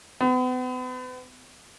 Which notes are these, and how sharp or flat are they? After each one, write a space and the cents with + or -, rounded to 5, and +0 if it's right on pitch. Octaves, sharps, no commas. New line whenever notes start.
B3 +40